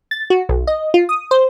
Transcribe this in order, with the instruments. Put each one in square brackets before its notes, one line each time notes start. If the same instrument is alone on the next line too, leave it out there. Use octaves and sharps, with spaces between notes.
[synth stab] A6
F#4
B1
D#5
F4
D#6
C5